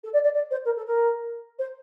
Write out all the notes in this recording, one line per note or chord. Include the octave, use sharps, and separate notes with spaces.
A4
D5
D5
D5
C5
A#4
A4
A#4
C5